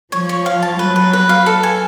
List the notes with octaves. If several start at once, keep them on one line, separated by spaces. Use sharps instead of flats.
F3 C#5
C#5
F5
A5
F#3 B4
B4
B4
F5
A4
G#5